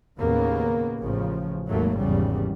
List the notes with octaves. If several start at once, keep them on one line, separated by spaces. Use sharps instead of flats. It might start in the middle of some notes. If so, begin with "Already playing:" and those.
D#2 A2 C#3 A#3 B3
A1 C#3 F3
G#1 D#2 F#3 A3 A#3
G#1 E2 G#2 C#3 G3